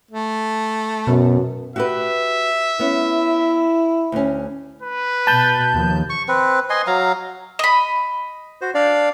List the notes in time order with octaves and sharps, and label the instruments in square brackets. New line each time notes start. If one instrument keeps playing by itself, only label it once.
[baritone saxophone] A3
[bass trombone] F#2 [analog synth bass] B2
[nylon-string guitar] F#4 G4 B4 [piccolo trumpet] E5
[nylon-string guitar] B3 C#4 [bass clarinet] E4
[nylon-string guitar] D2 C#4
[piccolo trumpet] B4
[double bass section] B2 [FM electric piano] A5 G6
[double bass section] D#2 F3
[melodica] C#6
C4 B4
D#5 G#5 C6
F#3 F5 A#5
[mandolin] D#5 B5
[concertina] F#4 C5
D4 D5 F5